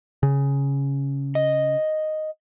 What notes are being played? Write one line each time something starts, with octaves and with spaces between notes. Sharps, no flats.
C#3
D#5